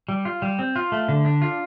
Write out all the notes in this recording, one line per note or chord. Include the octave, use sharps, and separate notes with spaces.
G3
F4
G3
C4
F4
A3
D3
D4
F4